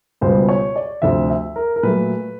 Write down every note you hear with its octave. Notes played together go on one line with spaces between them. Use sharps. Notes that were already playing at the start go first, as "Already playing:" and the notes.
C#2 B2 G3 B3 C5
C#5
D5
D2 C3 F3 E5
E5
A#4
A#4
A#2 F#3 A3 B4